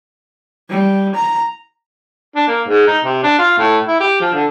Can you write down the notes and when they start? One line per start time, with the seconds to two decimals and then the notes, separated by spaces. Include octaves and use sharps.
0.70 G3
1.15 A#5
2.35 D4
2.47 A#3
2.68 G#2
2.87 D#4
3.04 C3
3.24 D4
3.38 F4
3.58 A2
3.88 E4
4.00 G4
4.20 F3
4.33 D3